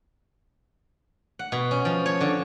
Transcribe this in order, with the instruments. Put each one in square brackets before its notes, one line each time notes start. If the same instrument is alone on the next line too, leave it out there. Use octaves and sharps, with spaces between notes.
[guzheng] F#5
B2
C#4
F3
C#5
D3